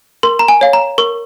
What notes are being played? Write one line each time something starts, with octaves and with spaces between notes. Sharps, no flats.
A#4 C6
A#5
G#5
C#5 F5
A#5
A#4 C#6